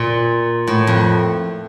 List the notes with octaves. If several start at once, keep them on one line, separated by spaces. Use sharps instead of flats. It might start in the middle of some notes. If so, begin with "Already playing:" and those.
Already playing: A#2
A2
F2